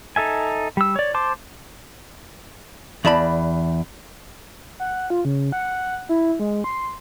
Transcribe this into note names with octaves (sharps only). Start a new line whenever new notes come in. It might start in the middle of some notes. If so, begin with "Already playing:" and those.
D#4 A4 E5 G#5
G3 E6
C#5 D5
C5 A5 C6 D6
E2 D5 A5 B5
F#5
F4
C#3
F#5
E4
G#3
C6